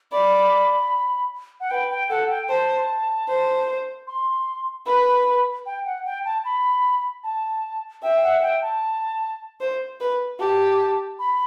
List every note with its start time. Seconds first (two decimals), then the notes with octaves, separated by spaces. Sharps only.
0.12 D5 B5
1.60 F#5
1.70 B4 G5
1.90 G5
2.10 A4 F#5
2.30 G5
2.49 C5 A5
3.28 C5
4.07 C6
4.86 B4 B5
5.66 G5
5.85 F#5
6.05 G5
6.25 A5
6.45 B5
7.24 A5
8.02 E5 G5
8.22 F#5
8.42 G5
8.62 A5
9.61 C5
10.00 B4
10.40 G4 A5
11.19 B5